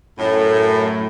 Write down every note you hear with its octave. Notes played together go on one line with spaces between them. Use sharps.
F#2 A2